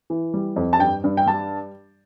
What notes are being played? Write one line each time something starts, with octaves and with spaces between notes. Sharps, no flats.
E3
G3
F2
A5
G2 G5
G2
G5
G3 A5